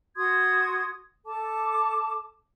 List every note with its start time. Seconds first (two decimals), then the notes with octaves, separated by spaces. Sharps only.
0.16 F#4 C6 D#6 G#6
1.25 A4 A5 D6